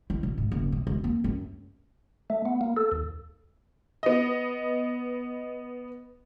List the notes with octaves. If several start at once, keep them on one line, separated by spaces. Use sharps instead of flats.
E4
B2
G#2
F#1
B2
E1
A#3
F#2
A3
B3
A#3
A4
D#2
B3 D#5